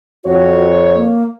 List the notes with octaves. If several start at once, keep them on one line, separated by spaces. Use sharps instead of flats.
F2 F#4 C#5
A#3